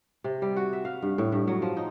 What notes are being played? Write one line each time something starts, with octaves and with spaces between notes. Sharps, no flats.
C3
G3
F#4
E5
F5
G2
A2
G2
F#3
F3
D#4